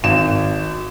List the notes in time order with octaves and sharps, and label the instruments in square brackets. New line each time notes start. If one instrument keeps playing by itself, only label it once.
[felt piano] G#1 E7